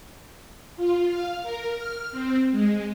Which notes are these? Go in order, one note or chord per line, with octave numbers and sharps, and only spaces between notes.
F4
F5
A#4
F6
C4
G#3